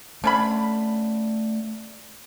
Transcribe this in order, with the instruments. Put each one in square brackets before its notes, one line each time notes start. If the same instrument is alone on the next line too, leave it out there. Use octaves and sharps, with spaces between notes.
[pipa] D3 C#4 B5 [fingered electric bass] A3